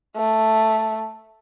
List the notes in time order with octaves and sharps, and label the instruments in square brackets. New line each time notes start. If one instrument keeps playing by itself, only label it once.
[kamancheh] A3